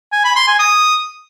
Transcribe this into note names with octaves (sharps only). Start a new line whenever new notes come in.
G#5
B5
C6
G#5
D#6